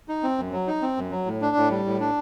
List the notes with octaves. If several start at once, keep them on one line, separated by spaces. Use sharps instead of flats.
D#4
C4
F#2
F#3
D#4
C4
F#2
F#3
A2
D4
A2
G3
A2
D4